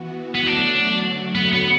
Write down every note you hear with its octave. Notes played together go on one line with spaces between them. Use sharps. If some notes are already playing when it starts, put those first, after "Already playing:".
Already playing: E3 B3 F#4
B3
D3 F#3 A3 D4 F#4
B3
B3